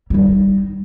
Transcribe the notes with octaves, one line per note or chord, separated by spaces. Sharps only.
G3 D#4